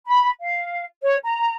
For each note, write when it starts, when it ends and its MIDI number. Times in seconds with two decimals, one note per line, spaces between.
0.06 0.30 83
0.41 0.85 77
1.03 1.16 73
1.24 1.55 82